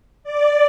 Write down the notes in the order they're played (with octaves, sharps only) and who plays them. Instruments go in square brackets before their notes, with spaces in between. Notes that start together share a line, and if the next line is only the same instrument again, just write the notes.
[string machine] D5